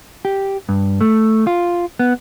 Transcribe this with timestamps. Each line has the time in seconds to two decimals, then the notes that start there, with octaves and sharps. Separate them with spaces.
0.25 G4
0.69 G2
1.01 A3
1.47 F4
1.99 B3